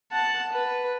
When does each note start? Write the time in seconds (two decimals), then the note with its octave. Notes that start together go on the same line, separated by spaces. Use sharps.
0.12 F#5 A5
0.52 B4